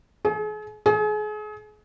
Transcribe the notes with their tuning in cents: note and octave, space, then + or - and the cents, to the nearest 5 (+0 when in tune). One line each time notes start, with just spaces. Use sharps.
G#4 +40
G#4 +35